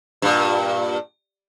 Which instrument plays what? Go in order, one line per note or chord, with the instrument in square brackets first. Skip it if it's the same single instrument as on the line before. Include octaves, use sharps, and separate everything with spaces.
[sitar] G2 A#2